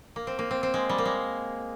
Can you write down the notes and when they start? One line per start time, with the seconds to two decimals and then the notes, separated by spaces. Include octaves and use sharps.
0.16 A#3
0.27 C4
0.39 A#3
0.51 C4
0.63 C4
0.74 G#3
0.89 G3
0.98 A#3
1.05 G#3